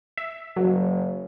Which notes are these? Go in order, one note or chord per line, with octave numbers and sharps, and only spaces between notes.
E5
F#1 F#3